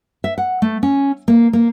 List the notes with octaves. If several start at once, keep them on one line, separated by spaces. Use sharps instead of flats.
E5
F#5
A3
C#4
A#3
A#3